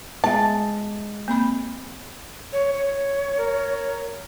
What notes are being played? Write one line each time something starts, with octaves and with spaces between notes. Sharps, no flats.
G#3 B3 E5 A5
A#3 C4 B5
C#5
C#5
A#4